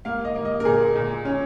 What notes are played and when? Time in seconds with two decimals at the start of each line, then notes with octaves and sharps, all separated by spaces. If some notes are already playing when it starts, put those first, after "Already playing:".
0.05 A#3 F5
0.25 D#5
0.36 A#3
0.45 D#5
0.60 A#4
0.65 A#2 G#4
0.96 A#2
1.25 C#4